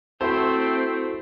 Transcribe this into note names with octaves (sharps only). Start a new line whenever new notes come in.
A3 C4 E4 F#4 A4 C5